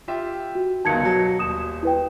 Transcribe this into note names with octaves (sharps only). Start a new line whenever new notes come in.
F4 G4 E5
F#4
G1 C#2 D#3 A5 G#6 C#7
B2 F#3
D#1 D#6 E7
E4 B4 G5